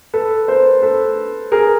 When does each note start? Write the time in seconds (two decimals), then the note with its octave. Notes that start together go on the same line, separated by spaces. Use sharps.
0.13 A4 B4
0.48 A#4 C5
0.82 A4 B4
1.52 G#4 A#4